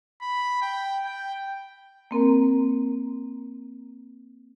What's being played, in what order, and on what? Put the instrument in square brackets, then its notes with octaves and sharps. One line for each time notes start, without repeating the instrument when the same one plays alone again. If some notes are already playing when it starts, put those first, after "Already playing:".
[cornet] B5
G5
G5
[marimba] A#3 C4 A#4 A#5